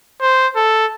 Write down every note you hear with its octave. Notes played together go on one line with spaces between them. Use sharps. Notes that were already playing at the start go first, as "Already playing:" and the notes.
C5
A4